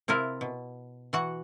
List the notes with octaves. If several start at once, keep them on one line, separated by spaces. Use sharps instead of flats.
C3 C4 E4 F4 A#4
B2
E3 F#4 F#5